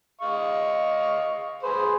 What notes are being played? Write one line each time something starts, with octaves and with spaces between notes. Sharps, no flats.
D#5 F5 C#6
G#4 B4 C5